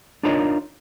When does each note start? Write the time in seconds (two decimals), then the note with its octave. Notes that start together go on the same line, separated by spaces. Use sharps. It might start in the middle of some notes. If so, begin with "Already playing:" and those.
0.23 D4 D#4 F4 A#4 C#5 D#5